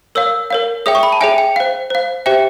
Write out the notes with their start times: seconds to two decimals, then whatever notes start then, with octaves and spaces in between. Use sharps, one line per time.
0.15 A#4 C#5 F5 E6
0.50 A#4 C#5 F5
0.86 G#4 C#5 E5 G5 D#6
0.95 C#6
1.03 B5
1.13 A5
1.21 G#4 C#5 E5 G5 G#5
1.38 G5
1.56 C5 F5
1.90 C5 F5
2.26 G4 C5 E5 G5